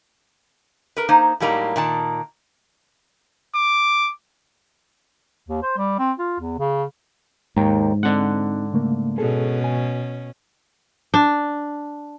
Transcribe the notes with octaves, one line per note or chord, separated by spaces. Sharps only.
A#4 B4
A#3 D#4 C5
A2 F#3 G3 A#3 D#4 A#5
A#2 D#3 A5
D6
D#2
C5
G3
C4
F4
E2
C#3
D#2 G#2 G5 A#5
D3 G#3 C4 D#4 F#5
C#3 A3 A#3
B2 C#4 G#4 A4
G#5
D4